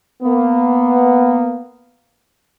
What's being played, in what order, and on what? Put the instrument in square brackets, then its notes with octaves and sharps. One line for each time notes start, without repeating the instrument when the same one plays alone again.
[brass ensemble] A#3 B3